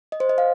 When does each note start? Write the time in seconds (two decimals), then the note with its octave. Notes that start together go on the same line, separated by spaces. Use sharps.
0.12 D#5
0.20 C5
0.29 D#5
0.38 F5